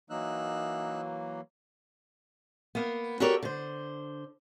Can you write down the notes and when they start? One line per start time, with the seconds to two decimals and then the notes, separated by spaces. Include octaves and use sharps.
0.10 E3 F#3 A#3 D#4 E6 F#6
2.75 A#3 B3
3.20 F#4 G4 A4 A#4 C#5 D5
3.43 D3 C5